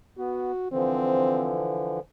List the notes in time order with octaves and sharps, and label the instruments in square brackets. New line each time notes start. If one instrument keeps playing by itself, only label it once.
[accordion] B3 [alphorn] F#4
[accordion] D3 E3 F3 [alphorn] C4